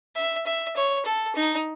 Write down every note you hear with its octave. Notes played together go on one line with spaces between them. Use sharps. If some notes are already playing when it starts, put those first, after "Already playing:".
E5
E5
C#5
A4
D#4